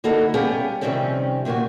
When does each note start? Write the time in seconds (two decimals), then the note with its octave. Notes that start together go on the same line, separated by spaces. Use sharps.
0.04 D3 A#3 D#4 E4 F#4 A4
0.34 G3 B3 C#4 G4 G#4 F5
0.81 C3 D#3 F3 G3 C4 C#4
1.45 A#2 D#3 A#3 F4 F#4